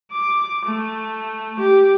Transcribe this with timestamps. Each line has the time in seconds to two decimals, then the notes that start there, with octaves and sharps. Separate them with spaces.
0.12 D6
0.65 A3
1.59 G4